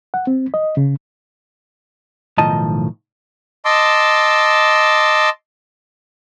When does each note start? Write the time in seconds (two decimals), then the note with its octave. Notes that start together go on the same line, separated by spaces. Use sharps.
0.14 F#5
0.27 C4
0.54 D#5
0.77 C#3
2.38 B1 A2 D#3 F3 D#5 A5
3.65 D#5 A5 C6 D6 E6